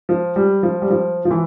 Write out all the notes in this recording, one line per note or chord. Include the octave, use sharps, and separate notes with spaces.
F3
G3
F3
G3
F3
F3
E3